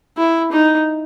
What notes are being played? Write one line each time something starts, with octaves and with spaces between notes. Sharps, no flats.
E4
D#4